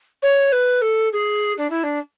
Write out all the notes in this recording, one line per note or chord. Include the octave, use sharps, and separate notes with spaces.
C#5
B4
A4
G#4
D4
E4
D4